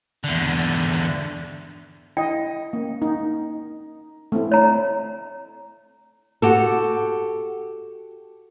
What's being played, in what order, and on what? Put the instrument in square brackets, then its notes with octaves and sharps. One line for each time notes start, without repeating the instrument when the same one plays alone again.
[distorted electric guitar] E2 D3
[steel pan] E4 D#5 [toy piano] G5
[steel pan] A#3 C#4
D#4
A3 C4 E4
[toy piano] C#5 A#5
[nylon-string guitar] F#4 G4 A4